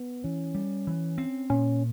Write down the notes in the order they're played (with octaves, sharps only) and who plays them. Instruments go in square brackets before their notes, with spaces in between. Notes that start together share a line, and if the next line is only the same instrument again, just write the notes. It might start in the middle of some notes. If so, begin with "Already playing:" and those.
Already playing: [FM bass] B3
[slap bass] E3 [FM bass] C#4
[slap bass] G3
E3
C4
[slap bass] A#2 [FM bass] C#4